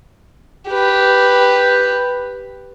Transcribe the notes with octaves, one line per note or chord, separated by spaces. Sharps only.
G4 B4